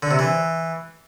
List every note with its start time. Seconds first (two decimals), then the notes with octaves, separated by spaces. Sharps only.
0.03 D3
0.11 C3
0.19 E3